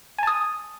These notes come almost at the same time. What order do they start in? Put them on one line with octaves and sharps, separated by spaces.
G#5 A5 D#6